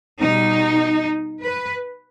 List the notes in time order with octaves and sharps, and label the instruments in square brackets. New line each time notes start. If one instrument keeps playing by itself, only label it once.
[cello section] B2 G3 D#4
B4